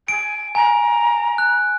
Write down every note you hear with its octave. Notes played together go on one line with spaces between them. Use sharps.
G#5 D7
G#5 A#5
F#6